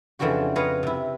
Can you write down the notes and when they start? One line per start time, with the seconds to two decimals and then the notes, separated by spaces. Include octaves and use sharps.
0.19 F2 C#3 E3 D4 F#4 G4
0.56 B4 C#5 D#5 F5 A#5
0.83 C3 E4